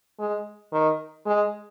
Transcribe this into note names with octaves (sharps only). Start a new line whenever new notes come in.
G#3
D#3
G#3